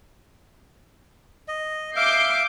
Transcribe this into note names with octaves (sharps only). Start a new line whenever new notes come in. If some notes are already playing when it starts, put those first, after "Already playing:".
D#5
E5 F5 D6 G6 C7